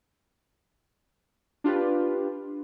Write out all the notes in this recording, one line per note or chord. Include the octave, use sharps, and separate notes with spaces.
D4 F4 G4 B4